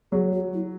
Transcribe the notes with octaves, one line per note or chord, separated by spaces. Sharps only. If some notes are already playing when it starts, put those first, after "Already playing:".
F#3 G#4
F#4
E4